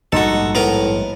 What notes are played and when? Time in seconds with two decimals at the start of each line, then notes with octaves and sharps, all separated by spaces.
0.12 A#1 G#2 G3 D#4 F#4 A4
0.55 A2 B3 A#4